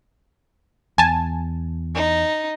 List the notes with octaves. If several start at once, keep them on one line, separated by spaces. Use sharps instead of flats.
E2 G#5 A5
D#4